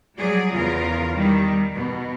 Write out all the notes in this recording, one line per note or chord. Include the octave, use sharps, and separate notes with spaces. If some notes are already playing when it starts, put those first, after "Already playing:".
F#3 G3 G#4 D5
E2 C#3 F4 A#4
D#3 G3
B2